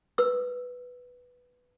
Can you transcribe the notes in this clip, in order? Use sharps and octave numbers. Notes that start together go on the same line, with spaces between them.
B4 E6